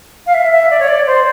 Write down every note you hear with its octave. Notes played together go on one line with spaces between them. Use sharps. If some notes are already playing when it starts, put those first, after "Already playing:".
F5
E5
E5
D5
C#5
D5
C5